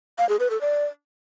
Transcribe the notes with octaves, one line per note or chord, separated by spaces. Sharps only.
F5
G#4
B4
A4
D5